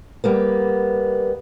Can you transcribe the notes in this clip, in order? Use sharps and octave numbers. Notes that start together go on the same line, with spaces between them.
G3 A#3 B3